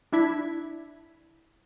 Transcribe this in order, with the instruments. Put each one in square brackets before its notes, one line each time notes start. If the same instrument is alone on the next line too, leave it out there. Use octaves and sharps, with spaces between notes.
[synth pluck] D4 E4 G#6 B6